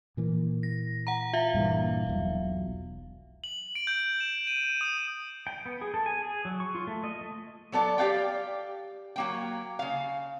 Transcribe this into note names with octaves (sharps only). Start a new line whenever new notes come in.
A#2 E3 A#3
A#6
F#5 A#5
F4 E5 F5
G2 A#2 E3
E1 B1
F#7
D7
G6
E7
D#7
D#6
G5
B3
G#4
A4
G#5
G#4
F#3
C#6
F4
A3
D#5
A3
F#3 B3 A4 D5
G4 D5 F5 G5
F#3 A#3 G5
C#3 F5